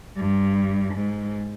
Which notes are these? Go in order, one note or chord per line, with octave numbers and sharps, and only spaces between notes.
G2
G#2